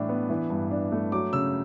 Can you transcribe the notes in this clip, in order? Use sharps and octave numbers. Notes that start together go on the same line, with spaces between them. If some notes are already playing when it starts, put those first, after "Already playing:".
Already playing: A2 E3 G3 D4
B3
E3
G2
D4
A3
F#3 D6
C#3 E6